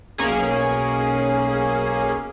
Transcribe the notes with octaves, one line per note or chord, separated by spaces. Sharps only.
B1 A#3 C#4 G#4